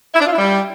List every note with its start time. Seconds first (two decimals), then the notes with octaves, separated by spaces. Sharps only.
0.14 E4
0.20 D4
0.26 F4
0.32 E4
0.38 G3